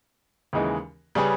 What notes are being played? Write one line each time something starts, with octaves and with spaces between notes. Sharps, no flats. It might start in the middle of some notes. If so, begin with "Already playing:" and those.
D#2 C#3 E3 G#3 D#4
C#3 G3 C#4 G#4 B4